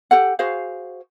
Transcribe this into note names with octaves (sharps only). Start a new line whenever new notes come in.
G4 A4 F#5
F#4 G#4 C5 F5